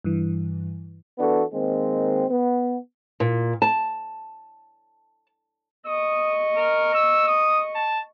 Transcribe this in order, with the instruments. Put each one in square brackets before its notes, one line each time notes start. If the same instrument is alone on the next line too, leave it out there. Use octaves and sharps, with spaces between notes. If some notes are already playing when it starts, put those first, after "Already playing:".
[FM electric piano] G2 E3
[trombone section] E3 B3 D4 F#4 A4
D#3 G#3 A#3 C4
B3
[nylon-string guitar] A#2
A5
[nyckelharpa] D#5 C#6 [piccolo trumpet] D#6
[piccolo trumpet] A#4
E6
D#6
A5